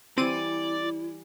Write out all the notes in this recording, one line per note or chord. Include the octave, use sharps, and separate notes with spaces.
E3 G3 C4 E4 D5 D#7